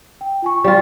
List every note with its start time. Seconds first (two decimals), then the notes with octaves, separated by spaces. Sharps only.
0.21 G5
0.42 F4 G#5 C#6
0.64 G3 F4 D5 F5 G5